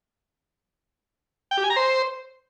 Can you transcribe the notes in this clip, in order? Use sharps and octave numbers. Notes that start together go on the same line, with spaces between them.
G5
G4
G#5
A#5
C5